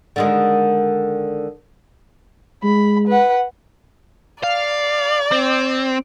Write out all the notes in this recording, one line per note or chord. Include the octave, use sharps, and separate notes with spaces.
D3 D#3 G#3
G#3 B5
B4 F#5
D5 F5
C4